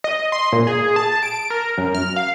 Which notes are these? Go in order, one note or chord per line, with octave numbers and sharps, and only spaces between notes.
D#5
C6
A#2
G#4
A5
D7
A#4
F#2
F6
F5